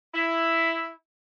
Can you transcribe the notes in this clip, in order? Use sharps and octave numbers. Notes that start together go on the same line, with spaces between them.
E4